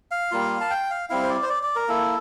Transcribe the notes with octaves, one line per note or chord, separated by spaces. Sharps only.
F5
G3 A#3 F4
A5
G5
F5
G3 C4 E4 F5
C5
D5
C5
D5
D5
A#4
A#3 E4 A4